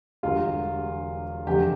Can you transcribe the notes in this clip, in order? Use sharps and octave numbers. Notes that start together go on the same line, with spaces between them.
E1 E2 D3 G3 F4
F1 E2 D3 G4